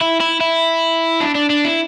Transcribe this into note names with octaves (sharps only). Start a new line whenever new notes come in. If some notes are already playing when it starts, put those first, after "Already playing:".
E4
E4
E4
D4
D4
D4
E4